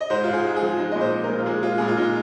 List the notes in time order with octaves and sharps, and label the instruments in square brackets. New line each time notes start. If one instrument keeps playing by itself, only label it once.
[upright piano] D#5
G#2 C5
G#2 F4
G#4
G#3
G#4
F3
G#3 D#4
A#2 D#5
C5
A#2
A#4
A#2
F4
G#3 G#4
G#3 F4
A#2 G#4
F4
G#3 D#4